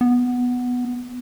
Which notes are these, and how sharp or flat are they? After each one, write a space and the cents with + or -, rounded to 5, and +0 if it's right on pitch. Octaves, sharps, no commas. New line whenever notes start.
B3 +0